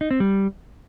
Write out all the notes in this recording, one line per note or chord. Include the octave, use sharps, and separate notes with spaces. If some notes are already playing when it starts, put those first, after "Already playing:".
D#4
C4
G3